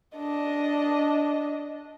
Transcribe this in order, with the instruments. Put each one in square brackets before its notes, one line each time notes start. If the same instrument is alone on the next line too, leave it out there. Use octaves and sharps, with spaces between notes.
[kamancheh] D4 D#5